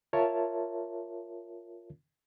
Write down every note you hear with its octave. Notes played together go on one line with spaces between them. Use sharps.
F4 A#4 C#5 E5 A5